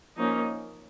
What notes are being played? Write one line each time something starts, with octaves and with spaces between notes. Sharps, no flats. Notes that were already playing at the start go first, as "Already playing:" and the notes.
F3 A#3 C#4 D#4